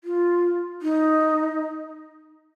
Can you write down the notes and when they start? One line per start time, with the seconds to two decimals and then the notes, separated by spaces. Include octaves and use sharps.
0.04 F4
0.82 D#4